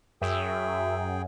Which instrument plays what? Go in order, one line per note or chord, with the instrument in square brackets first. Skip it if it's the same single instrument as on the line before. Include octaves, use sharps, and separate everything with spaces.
[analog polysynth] F#2 [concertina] G#4 G5 [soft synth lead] E5